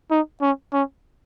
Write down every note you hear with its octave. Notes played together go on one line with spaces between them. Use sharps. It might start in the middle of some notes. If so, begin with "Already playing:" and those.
D#4
C#4
C#4